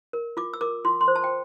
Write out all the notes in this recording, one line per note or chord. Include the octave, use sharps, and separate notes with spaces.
A#4
F4 D6
E6
A#4 D6
F4 C6
C6
C5
A5
G5